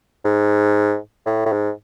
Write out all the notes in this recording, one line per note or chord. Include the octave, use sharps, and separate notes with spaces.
G#2
A2
A2
G#2